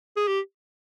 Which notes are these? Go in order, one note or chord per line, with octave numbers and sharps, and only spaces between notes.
G#4
G4